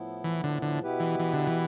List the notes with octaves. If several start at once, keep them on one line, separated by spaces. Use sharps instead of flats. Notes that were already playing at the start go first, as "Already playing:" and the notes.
Already playing: A2 F3 B3 E4
E3
D3
D3
B2 B3 E4 G4 B4
E3
E3
D3
E3